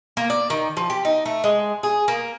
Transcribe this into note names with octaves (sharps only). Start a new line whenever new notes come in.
A#3
D5
D#3
F3
G4
D#4
A3
G#3
G#4
A#3